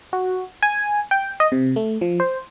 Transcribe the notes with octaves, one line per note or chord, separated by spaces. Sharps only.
F#4
G#5
G5
D#5
C3
A3
F3
C5